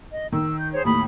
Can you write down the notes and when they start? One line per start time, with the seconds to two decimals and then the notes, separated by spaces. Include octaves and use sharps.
0.13 D#5
0.32 D#3 E6
0.60 G6
0.73 G#4 C5 C#5
0.85 D#2 A2 B5 D#6